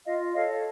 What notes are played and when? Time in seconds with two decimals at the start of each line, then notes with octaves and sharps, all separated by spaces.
0.05 F4 D#5 F5
0.34 A4 C#5 D#5 F5